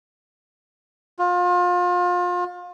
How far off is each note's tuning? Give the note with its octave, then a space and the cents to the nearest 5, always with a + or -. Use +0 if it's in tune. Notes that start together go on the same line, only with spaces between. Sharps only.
F4 +30